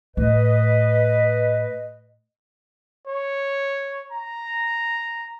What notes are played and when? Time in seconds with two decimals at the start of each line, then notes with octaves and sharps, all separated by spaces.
0.17 A2 B4 D#5
3.08 C#5
4.12 A#5